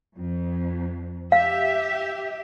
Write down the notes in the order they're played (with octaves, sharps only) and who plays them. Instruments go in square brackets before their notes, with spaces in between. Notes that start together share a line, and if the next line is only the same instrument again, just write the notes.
[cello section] F2
[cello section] G4 E5 [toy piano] F5